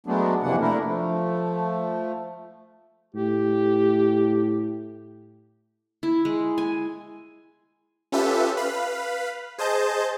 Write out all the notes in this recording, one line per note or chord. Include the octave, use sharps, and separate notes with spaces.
F#3 G#3 A3 B3 D4
F2 C3 E3 A#3 D4 F#5
A3 D4 E4 A#4
F3 A3
A2 G4
E4
G#3
G#5
C#4 F4 G4 A4 B4 E5
B4 F5 B5
G#4 C5 D#5 A5 G6